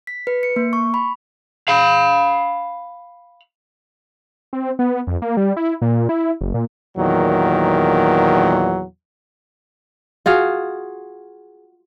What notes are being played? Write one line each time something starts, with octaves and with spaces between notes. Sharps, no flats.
B6
B4
C#7
A#3
C#6
B5
F5 B5
C4
B3
F2
A#3
G3
E4
A#2
E4
F#1
A#2
E2 A#2 D#3 F#3
F4 F#4 G#4 F5